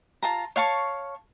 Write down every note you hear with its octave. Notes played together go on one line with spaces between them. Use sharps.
F4 A5 A#5
C#5 F5 A5 C#6